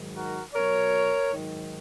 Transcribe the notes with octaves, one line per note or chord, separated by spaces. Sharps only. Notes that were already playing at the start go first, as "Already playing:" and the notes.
Already playing: G#2 D#3 F#3
F#4 A#4
B2 F#3 A#4 C#5
G#2 D#3 F#3